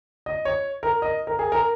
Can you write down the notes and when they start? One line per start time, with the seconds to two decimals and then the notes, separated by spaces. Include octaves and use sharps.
0.26 D#5
0.45 C#5
0.83 A#4
1.02 D#5
1.27 A#4
1.39 G#4
1.52 A#4